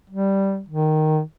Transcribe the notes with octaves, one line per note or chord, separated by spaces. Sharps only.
G3
D#3